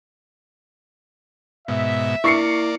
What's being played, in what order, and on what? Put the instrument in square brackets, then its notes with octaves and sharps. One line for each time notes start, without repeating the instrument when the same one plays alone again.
[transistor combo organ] G#2 B2 [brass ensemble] E5
[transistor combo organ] A#3 D5 [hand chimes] E4 [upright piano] C#6 C7 C#7